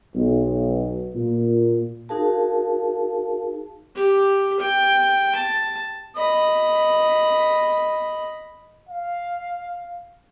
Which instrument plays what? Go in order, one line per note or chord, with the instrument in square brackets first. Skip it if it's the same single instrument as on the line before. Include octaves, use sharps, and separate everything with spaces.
[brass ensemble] B1
A#2
[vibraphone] D#4 F#4 G#4 A#4 F5 A5
[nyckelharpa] G4
G5
A5
D#5 B5
[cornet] F5